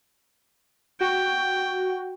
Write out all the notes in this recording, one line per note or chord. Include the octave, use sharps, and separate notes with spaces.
F#4 G5